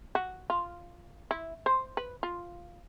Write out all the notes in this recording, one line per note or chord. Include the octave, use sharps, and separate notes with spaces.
F#4
F4
E4
C5
B4
F4